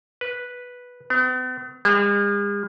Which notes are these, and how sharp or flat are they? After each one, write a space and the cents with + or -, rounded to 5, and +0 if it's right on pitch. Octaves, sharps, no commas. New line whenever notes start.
B4 -5
B3 +45
G#3 -45